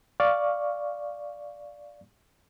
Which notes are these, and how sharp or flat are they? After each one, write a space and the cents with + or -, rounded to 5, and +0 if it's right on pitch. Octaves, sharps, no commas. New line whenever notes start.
D5 +0 F5 +0 C#6 +0